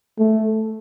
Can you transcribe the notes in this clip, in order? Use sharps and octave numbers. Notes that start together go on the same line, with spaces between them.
A3